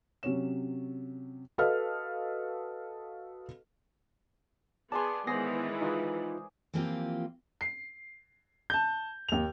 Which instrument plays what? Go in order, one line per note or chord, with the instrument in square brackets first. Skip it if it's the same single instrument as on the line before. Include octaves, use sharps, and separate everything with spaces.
[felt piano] C3 F#3 C#4 C#5 E7
F#4 A4 B4 D#5 F5 F6
[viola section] B3 G#4 [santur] D5 G#5 C6 [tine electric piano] A5
[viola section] D#3 E3 G#3 [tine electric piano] B3 A#6 C7 [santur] G#4 C5
[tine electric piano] D#4 F4 B4
[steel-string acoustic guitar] E3 F3 A#3 C4 F4 G4
[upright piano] C7
A5 G6
D#2 F7